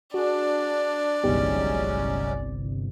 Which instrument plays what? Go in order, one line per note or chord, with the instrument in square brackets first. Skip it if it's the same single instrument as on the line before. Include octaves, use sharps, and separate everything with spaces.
[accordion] D4 [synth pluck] F#4 G#4 [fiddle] D5
[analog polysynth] G1 C2 [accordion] F#3 G#3 C#4 [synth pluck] B3 D#4 G4